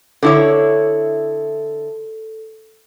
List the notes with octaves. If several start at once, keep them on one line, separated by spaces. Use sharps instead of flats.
D3 E4 A4 C#5